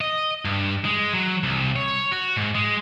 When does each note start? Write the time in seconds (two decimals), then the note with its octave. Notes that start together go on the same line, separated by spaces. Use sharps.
0.01 D#5
0.45 G2
0.85 G#3
1.13 F#3
1.43 C2
1.76 C#5
2.12 F#4
2.37 G#2
2.55 G#3